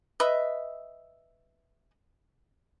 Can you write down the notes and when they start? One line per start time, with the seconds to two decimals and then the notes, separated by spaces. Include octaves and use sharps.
0.20 B4 D#5 E5